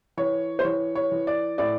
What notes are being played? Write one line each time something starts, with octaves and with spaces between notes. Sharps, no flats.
E3 C#5
C5
E3 C#5
C#5
E3
D5
A2 D5